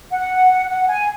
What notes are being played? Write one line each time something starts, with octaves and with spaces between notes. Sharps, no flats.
F#5
F#5
G#5